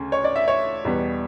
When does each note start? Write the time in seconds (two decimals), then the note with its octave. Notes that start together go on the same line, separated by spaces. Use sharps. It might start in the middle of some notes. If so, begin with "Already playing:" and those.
Already playing: D2 C#3
0.12 C#5
0.24 D5
0.36 E5
0.48 C#5
0.85 E2 B2 G3 B3